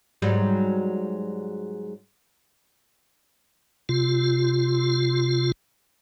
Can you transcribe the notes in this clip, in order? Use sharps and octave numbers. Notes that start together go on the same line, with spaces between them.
G#2 F#3 G3
C3 F4